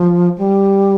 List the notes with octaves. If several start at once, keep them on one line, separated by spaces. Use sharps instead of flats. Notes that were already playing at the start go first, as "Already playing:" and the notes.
Already playing: F3
G3